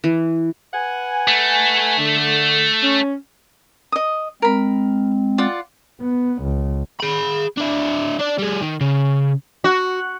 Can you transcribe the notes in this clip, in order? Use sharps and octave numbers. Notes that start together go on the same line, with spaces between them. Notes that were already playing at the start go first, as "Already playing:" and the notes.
E3
B4 F#5 G#5
A3
D3
C#4
D#5 D#6
G#3 C4 A#4 B5
F4 D5 F#5
B3
C#2
G#4 B5
D4 E4
D4 D5
G3 G#4
D#3
C#3
F#4